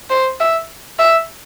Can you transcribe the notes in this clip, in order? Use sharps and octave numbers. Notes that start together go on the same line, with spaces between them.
C5
E5
E5